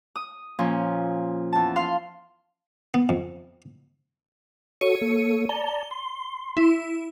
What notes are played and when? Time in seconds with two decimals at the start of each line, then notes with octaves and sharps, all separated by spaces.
0.16 D#6
0.59 A#2 F3 C#4
1.53 E2 A5
1.76 F5 C6
2.94 B3
3.09 F2
4.81 F#4 A4 C#5 C#7 D#7
5.01 A#3 A4
5.49 D5 A5 A#5 G7
5.91 C6
6.57 E4